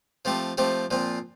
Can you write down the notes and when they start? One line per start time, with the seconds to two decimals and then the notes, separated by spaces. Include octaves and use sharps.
0.25 F3 A3 C4 G4
0.58 F3 A3 C4 G4
0.91 A#2 F3 C4